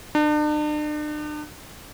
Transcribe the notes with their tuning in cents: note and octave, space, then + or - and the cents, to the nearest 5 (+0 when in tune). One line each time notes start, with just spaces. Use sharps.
D4 +40